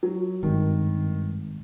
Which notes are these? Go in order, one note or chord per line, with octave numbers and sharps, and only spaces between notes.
F#3
G#1 G2 D#3